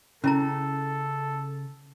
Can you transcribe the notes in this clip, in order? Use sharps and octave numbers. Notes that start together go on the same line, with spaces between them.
C#3 C#4 E4 A4 A#5